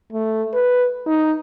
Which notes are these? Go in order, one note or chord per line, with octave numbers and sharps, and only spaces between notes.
A3
B4
D#4